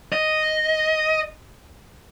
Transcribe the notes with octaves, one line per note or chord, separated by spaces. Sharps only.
D#5